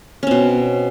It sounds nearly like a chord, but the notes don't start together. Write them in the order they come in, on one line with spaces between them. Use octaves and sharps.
C#4 C4 B2